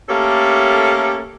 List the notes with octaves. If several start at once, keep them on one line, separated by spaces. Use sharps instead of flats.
A3 A#3 C#4 G4 A4